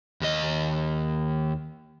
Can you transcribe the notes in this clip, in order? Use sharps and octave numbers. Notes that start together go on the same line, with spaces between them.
D#2 D#5